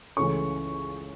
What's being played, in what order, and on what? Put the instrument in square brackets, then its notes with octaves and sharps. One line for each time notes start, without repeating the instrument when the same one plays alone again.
[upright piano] C#2 C#3 E3 A3 C#4 C#6